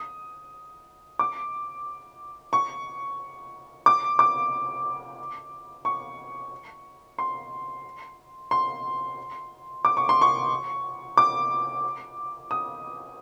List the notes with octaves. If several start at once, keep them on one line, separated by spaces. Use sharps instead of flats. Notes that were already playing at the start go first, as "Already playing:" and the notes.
Already playing: D#6
D6
C#6
D6
D6
C#6
C6
C6
D6
C#6
C6
C#6
D6
D#6